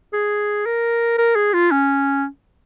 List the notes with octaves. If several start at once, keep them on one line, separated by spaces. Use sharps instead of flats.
G#4
A#4
A#4
G#4
F4
C#4